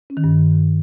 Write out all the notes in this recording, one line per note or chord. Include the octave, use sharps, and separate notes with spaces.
C#4
D#3
G2